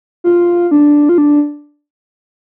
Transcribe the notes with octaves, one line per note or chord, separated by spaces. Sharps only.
F4
D4
F4
D4